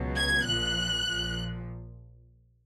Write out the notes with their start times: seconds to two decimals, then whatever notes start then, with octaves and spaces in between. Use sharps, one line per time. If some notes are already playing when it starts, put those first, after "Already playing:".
Already playing: C#2 B2 F#3
0.15 G#6
0.45 A#1 A#2 F3 F#6
1.03 A#1 A#2 F3